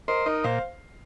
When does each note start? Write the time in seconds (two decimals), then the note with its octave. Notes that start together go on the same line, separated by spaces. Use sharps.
0.08 A#4 C5 D#5
0.26 D#4 A#4 D#5
0.44 A#2 C5 F5